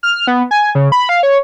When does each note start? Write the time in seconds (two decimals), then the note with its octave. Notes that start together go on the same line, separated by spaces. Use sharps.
0.03 F6
0.27 B3
0.51 G#5
0.75 C#3
0.92 B5
1.09 F5
1.23 C#5